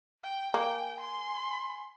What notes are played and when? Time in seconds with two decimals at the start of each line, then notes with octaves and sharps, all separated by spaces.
0.23 G5
0.54 A#3 G5 G#5
1.00 C6